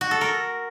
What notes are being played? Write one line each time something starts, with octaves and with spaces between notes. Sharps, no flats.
F#4
A4
A#4